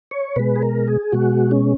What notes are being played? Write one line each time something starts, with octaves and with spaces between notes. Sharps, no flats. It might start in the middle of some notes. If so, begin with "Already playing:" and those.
C#5
B2 G#3 B4
G#4
A#4
G#4
B2 G#3 F#4
C#4